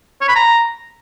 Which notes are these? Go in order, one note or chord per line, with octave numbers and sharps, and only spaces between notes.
C#5
B5
A#5